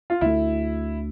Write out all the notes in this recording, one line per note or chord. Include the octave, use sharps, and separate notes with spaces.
F4
D2 D3 A3 E4